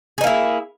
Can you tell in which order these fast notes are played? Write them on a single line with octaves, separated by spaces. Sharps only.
G#4 D#4 A#3 E4